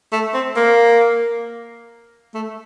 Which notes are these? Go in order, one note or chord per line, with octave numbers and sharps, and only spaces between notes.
A3
C4
A#3
A3